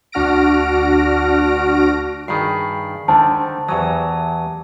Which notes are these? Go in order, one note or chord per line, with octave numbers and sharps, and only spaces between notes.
D2 D4 F#4 F6 A#6 D7
G2 D#3 G#4 B5 C7
D3 D#3 C5 A5
E2 F#3 G4 G#5 D#6